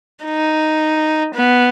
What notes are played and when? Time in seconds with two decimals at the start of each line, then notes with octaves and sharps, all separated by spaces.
0.25 D#4
1.34 B3